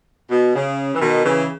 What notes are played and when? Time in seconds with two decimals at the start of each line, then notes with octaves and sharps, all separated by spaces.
0.30 B2
0.54 C#3
0.95 E3
1.01 B2 D#3
1.24 C#3 E3